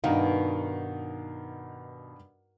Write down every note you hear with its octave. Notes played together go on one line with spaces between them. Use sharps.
G2 B2 D#3 D#4 F5